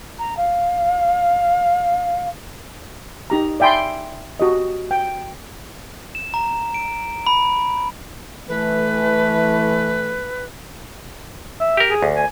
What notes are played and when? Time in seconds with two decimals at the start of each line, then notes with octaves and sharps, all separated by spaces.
0.19 A#5
0.37 F5
3.30 D#4 G4 A#5
3.60 D5 E5 G5 G#5 B5 C6
4.40 F#4 G4 D#5
4.91 G5
6.15 E7
6.34 A#5
6.74 D7
7.27 B5
8.48 E3 A3 B4
11.60 E5
11.77 G4 A#4
11.90 G#4
12.03 D2
12.16 G#5